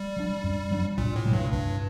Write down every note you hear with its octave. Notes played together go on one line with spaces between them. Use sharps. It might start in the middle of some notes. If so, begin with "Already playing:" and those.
Already playing: G3
F#3 A#3 D4
F#2
F#3 A#3 D4
C2 A#2
A2
C3 F#3 A3
G2
C2 G2